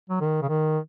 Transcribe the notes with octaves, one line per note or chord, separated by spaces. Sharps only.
F#3
D#3
C#3
D#3